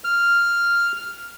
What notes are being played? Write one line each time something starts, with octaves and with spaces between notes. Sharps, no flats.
F6